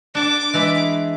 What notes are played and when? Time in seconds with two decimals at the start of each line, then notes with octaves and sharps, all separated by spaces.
0.15 D4 A5 D6
0.54 E3 G#3 B5